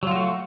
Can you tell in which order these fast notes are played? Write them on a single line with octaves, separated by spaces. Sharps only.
F#3 F4 F#4 A3